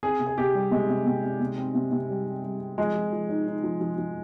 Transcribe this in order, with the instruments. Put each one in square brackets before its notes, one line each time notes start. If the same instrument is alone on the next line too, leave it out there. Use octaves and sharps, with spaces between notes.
[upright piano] C4 [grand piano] G#4
[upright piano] C3
[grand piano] G#4
[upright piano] C3 [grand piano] G4
[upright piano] G3
[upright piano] C3 [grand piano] G#3
[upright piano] C3
C3
C3
C3
C4
C3
C3
G3
C4
G3
C4
[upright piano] F3 [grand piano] G#3
[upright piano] F3
F3
D#4
D#4
F3
F3
F3